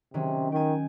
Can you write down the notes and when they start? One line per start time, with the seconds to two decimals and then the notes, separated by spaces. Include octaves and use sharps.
0.14 C3 D#3 F#3 C#4
0.52 D#3 G5 G#5